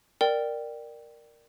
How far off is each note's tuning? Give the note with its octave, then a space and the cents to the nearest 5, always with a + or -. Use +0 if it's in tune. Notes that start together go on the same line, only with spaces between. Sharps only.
A#4 +0 D5 +15 G5 -10